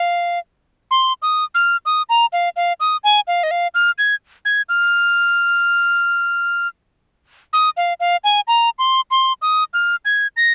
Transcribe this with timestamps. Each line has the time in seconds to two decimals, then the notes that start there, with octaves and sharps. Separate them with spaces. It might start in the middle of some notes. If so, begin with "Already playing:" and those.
Already playing: F5
0.91 C6
1.22 D#6
1.55 F6
1.86 D#6
2.09 A#5
2.33 F5
2.56 F5
2.80 D#6
3.04 G#5
3.27 F5
3.43 D#5
3.51 F5
3.74 F6
3.98 G#6
4.45 G#6
4.69 F6
7.53 D#6
7.77 F5
8.00 F5
8.24 G#5
8.48 A#5
8.79 C6
9.11 C6
9.42 D#6
9.74 F6
10.05 G#6
10.37 A#6